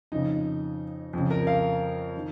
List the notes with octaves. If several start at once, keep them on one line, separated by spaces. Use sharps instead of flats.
F2 C#3 D#4
F2 C#3
A#4
F5
D#3